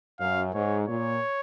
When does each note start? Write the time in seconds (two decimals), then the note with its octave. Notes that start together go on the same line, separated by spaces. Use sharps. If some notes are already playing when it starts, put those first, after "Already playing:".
0.20 F#2 F5
0.54 G#2 C#5
0.87 A#2 C#5